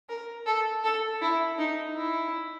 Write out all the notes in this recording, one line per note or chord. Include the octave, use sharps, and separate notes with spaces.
A#4
A4
A4
E4
D#4
E4